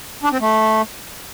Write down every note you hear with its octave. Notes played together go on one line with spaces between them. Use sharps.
D4
C4
A3